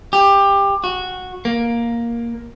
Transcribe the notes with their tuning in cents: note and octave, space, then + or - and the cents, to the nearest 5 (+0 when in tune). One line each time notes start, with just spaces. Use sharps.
G4 +20
F#4 -10
A#3 +5